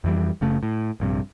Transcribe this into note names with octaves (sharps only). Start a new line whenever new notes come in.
F2 E3 G3
F#1 C#3 A3
A2
A#1 G2 C3